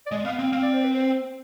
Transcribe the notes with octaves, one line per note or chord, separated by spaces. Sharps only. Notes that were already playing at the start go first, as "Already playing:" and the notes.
D5
G#3 D#5
B3 F5
C4 F5
C4 F5
D5
C5
B4
C5